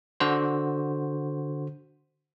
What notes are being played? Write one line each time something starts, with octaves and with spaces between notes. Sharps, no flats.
D3 F#4 C5